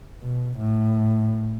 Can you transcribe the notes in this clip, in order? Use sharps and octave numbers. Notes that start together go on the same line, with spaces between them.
B2
A2